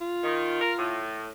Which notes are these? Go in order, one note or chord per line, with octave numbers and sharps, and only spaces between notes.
F4
D#3
A#4
A2